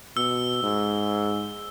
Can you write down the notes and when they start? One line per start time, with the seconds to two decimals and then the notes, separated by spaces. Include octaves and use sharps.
0.17 B2 E6
0.63 G#2